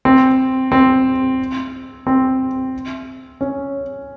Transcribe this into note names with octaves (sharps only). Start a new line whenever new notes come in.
C4
C4
C4
C#4